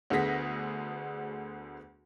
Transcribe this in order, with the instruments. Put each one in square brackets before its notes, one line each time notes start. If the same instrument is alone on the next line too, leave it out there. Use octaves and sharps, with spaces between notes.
[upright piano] D2 D3 B3 G#4 A#6 B6